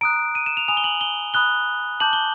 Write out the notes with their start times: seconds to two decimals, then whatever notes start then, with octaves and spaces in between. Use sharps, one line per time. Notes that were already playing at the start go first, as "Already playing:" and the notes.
0.01 A#5 D#6 F#6 D7
0.35 D#7
0.46 E7
0.57 F7
0.68 G#5 B5 D#6 F7
0.77 G7
0.84 F#7
1.01 G7
1.34 B5 D#6 F#6 G7
2.00 A5 D6 G6 F#7
2.13 G7